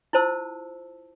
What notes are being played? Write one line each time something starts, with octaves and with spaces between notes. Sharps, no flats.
E4 F4 C5 A5 E6